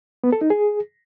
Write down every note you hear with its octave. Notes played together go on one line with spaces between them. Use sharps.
B3
A4
D#4
G#4